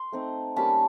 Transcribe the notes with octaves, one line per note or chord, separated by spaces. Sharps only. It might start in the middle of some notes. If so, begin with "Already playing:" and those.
Already playing: C6
A3 C4 D#4
G3 A#3 C#4 A5 B5